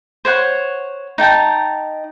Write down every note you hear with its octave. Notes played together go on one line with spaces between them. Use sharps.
C5 C#5 F#5
D#4 G5 A5 A#5